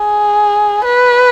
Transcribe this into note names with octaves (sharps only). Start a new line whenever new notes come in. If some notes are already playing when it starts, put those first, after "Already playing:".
Already playing: G#4
B4